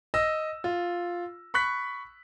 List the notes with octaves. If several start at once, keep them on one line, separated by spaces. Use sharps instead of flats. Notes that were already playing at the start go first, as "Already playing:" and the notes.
D#5 E6 A#6
F4
B5 C#6 F#6 B6